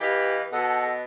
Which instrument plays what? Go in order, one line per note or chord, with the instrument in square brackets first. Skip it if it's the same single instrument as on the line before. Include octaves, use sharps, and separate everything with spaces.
[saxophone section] E3 G4 [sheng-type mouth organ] B4 D#5 F5
[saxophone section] B2 [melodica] A4 F#5 [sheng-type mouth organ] D#5